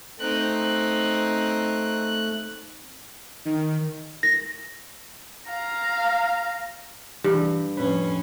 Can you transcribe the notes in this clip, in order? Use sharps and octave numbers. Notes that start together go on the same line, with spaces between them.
A3 C4 D#4 F#6
D#3
A#6
F5 A#5
G2 E3 G3
F2 A2 C#4 B4 B5